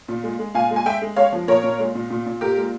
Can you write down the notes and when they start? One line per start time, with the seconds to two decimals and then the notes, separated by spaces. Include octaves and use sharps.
0.08 A#2
0.24 G#3
0.39 G#3
0.55 A#2 F5 G#5
0.71 G#3
0.76 G#5
0.85 G#3 E5 G5
1.02 G#3
1.16 G#3 C#5 F5
1.32 F3
1.48 A#2 A#4 C#5
1.63 A#2
1.79 G#3
1.95 A#2
2.10 A#2
2.26 A#2
2.41 A#2 G4 A#4
2.57 G#3